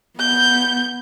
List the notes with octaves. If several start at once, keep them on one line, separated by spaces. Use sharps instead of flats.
B3 G6